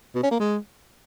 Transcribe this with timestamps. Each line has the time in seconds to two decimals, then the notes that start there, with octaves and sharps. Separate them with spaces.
0.15 B2
0.23 C#4
0.31 A#3
0.40 G#3